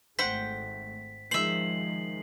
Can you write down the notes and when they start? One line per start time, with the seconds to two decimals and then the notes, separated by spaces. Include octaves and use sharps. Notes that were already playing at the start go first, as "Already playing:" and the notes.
0.19 G#1 A3 C5 F#5 G5 B6
1.31 D#3 F3 G#3 C5 E5 C7 F#7